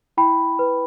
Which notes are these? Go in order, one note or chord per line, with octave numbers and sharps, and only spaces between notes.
E4 G5 B5
B4